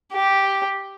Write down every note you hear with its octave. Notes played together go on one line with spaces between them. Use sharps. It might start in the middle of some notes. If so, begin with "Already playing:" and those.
G4